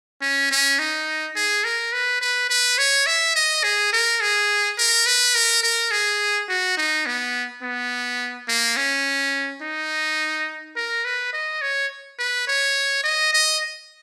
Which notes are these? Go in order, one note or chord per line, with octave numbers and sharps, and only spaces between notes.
C#4
C#4
D#4
G#4
A#4
B4
B4
B4
C#5
E5
D#5
G#4
A#4
G#4
A#4
B4
A#4
A#4
G#4
F#4
D#4
B3
B3
A#3
C#4
D#4
A#4
B4
D#5
C#5
B4
C#5
D#5
D#5